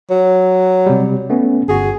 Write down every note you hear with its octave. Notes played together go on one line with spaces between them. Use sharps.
F#3
C3 G3
A3 B3 C#4
G1 F#4 G#4